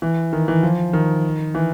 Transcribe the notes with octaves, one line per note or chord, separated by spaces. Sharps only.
E3
D#3
E3
F3
D#3
E3